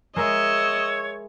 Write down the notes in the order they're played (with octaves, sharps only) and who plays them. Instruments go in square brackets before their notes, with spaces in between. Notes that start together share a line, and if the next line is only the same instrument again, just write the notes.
[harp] G#3 A#4 E5 [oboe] C#5 [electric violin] D#5 E6